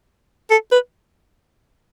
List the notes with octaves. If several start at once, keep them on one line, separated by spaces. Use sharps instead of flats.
A4
B4